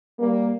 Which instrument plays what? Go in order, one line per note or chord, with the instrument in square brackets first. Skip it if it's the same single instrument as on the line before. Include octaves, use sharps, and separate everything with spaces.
[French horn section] G3 A#3